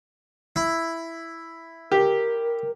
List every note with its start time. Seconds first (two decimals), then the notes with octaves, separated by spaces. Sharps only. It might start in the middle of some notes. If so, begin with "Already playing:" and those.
0.56 E4
1.92 G4 A#4